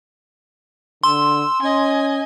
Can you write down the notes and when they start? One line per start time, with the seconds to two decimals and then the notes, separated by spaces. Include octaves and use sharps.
1.04 D3 C6 E6
1.62 C#4 D#5 G#5